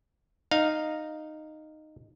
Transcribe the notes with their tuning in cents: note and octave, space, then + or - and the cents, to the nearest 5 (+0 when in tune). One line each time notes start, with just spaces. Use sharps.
D#4 -10 F5 +0